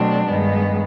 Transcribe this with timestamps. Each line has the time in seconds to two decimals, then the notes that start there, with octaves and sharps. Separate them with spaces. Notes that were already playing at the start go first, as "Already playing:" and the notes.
Already playing: B2 F#3 A3 C4 D4
0.27 G2 D#3 G#3 B3